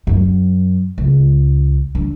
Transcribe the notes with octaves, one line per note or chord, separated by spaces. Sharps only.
F#2
C#2
D3